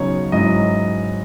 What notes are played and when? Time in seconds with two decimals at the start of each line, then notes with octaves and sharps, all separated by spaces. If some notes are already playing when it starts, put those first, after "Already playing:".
Already playing: C#3 F#3 B3 D#4 C#5
0.32 G#2 F#3 C#4 E4 D#5